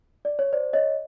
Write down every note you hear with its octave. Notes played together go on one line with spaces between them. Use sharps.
D5
C#5
C5 D5
C#5 D#5